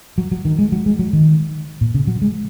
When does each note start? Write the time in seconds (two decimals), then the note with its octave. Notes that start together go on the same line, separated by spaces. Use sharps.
0.18 F#3
0.32 F#3
0.45 D#3
0.59 G#3
0.72 F#3
0.86 G#3
0.99 F#3
1.13 D#3
1.81 A#2
1.94 C#3
2.07 F#3
2.22 G#3